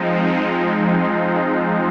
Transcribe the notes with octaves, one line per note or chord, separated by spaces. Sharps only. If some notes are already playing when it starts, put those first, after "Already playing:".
Already playing: F3 G#3 C4 D#4